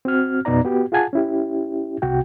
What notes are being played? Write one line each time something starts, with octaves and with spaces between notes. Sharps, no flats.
C4 F#4 F6
F2 B2 B3 D#4 D5 A#5
B3 F#4 G4
F4 G#4 F#5 G#5 A5
C#4 E4 G4
C2 C3 F#4 G5